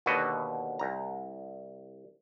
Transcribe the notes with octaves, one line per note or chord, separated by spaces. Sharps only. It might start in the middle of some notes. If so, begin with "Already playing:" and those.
D#2 B2 D3 B3 F#4 D#5
C2 A#5